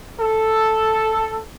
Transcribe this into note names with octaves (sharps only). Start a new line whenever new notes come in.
A4